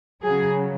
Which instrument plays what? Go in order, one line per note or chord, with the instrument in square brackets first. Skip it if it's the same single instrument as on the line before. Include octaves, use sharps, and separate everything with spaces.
[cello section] C#3 F#3 G#4